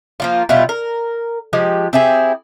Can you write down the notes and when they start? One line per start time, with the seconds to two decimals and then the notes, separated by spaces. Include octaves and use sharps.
0.20 F3 A#3 F4
0.49 B2 G3 E4 F4
0.69 A#4
1.53 F3 G#3 G4
1.93 C4 E4 G4 G#4